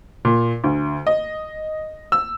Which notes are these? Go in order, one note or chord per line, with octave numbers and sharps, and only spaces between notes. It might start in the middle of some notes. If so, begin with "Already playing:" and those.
A#2
D2
D#5
E6